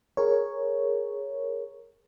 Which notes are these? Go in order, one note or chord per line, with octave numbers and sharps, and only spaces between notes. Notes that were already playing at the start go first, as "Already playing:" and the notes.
G#4 A#4 C#5